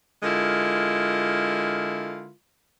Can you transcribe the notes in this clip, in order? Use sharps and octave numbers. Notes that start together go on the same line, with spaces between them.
D3 G#3 E4 F4 A#4